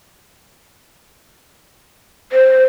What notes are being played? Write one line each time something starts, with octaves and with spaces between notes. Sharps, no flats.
C5